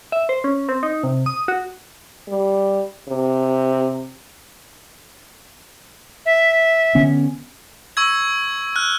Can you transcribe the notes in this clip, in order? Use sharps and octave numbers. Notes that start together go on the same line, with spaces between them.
E5
C5
C#4
C4
D#4
C3
D#6
F#4
G3
C3
E5
D3 B3 C#4
C#6 E6 G#6
F6 F#6